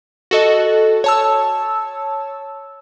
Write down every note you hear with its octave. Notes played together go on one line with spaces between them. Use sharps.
F#4 A4 D#5
C#5 A5 E6